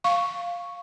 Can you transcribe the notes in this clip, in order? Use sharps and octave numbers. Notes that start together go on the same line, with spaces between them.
F5 C#6